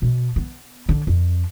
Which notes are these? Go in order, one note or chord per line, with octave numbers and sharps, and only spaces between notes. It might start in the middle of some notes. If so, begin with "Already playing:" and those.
B2
B3
D3
F2